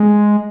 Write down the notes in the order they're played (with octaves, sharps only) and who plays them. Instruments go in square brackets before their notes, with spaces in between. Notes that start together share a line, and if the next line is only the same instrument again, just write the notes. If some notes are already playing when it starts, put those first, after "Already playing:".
Already playing: [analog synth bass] G#3